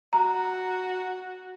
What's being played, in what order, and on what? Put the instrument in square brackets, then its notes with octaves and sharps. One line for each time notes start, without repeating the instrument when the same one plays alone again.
[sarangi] F#4 [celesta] A#5